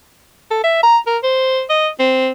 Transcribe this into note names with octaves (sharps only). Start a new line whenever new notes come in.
A4
E5
A#5
A#4
C5
D#5
C4